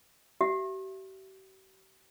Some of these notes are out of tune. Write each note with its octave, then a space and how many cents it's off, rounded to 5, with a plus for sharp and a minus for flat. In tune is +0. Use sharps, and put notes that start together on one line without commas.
G4 -45 E5 +25